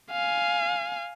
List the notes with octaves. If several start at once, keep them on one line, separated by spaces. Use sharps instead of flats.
F5 G#5